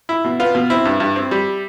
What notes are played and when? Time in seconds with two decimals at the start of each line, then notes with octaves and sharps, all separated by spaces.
0.09 E4
0.24 B2
0.40 B3 F4
0.55 B2
0.70 C4 E4
0.85 G2
1.00 G2
1.16 C4
1.31 G3